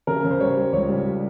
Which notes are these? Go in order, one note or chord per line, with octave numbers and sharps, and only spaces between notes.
C#3 A#4
C#3
C5
G3 C#5
G3
C#2 C#5
G3
G3